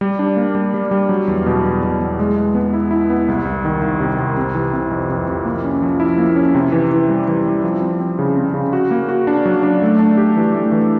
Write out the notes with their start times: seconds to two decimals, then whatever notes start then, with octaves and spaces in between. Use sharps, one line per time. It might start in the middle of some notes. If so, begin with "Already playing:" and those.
0.01 G3
0.19 D4
0.37 A#3
0.55 G3
0.74 G3
0.91 G3
1.09 F#3
1.28 E2
1.46 B2
1.64 E2
1.82 B2
2.00 E2
2.19 G#3
2.36 G#3
2.55 B3
2.73 E4
2.91 E4
3.10 B3
3.28 C2
3.45 C2
3.65 D#3
3.82 C2
4.00 C3
4.19 C2
4.37 C3
4.55 E3
4.73 C3
4.91 F2
5.10 C3
5.28 F2
5.45 A#3
5.64 C#4
5.82 F3
6.00 E4
6.18 A#3
6.36 C#4
6.55 C3
6.72 E3
6.91 E3
7.08 G3
7.28 E3
7.45 G3
7.64 F3
7.81 C4
8.00 C4
8.19 C#3
8.37 C4
8.54 C#3
8.73 F#4
8.91 A#3
9.09 F#4
9.27 D4
9.46 F#3
9.63 D4
9.82 A3
9.99 D4
10.17 G4
10.36 E3
10.55 A3
10.72 E3